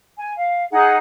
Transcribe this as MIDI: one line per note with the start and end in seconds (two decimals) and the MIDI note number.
0.17 0.32 80
0.36 0.65 77
0.71 0.95 63
0.71 0.95 68
0.71 0.95 78